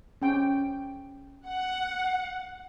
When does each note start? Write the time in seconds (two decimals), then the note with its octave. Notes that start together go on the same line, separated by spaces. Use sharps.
0.22 C#4 G5
1.47 F#5